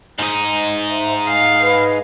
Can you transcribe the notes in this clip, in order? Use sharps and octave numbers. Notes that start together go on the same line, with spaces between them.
G#2 D#4
C5 E5
F5 G#5
G#4 B4 D#5